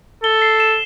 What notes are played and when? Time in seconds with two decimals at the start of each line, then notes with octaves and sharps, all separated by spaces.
0.24 A4 G7
0.42 C7
0.60 E7